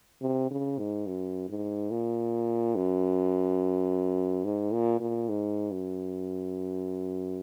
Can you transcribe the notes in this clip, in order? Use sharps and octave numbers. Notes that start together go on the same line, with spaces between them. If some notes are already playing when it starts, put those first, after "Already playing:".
C3
C#3
G#2
F#2
G#2
A#2
F#2
G#2
A#2
A#2
G#2
F#2